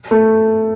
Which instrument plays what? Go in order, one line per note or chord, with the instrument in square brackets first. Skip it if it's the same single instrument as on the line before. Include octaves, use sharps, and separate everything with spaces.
[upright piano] A3